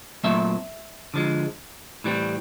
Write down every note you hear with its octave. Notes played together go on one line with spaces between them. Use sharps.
A#2 F#3 A3 C4 E5
D3 F3 G#3
A2 E3 G3 C4